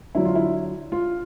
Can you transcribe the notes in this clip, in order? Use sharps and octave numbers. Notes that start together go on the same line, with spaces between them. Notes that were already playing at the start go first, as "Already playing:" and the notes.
D3 F#3 E4
F4
E4
F4